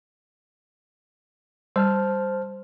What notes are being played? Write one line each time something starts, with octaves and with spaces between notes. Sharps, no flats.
G3 C5 A5 F6